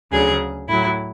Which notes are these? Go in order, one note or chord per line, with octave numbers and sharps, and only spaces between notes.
D2 C#3 F#3 G#4
A2 F#3 E4